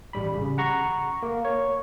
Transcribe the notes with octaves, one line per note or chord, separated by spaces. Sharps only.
A1 G3 B5
C#3
F#5 A#5 C#6
A#3
C#5